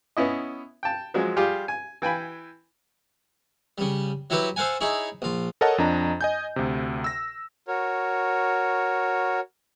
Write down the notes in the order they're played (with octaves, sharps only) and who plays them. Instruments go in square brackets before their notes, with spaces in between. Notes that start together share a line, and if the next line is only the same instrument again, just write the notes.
[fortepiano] B3 C#4 E4 D#5
G5 A5
F3 F#3 G#3
G3 F4 G4 G#4
G#5
E3 G5 G#5 B5
[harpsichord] C#3 G3
F#3 E4 F#4 G4 B4
A4 C5 F5 F#5 G#5
D#4 E4 G#4 C#5
A#1 F4
[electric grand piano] A4 A#4 C#5 D#5 F#5 A5
F2 D4 D#5 A#5
D#5 G#5 G6
D2 C3
E6 A#6
[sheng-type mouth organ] F#4 A#4 C#5